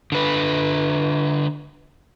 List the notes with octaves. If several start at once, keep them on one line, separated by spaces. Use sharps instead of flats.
D3 B4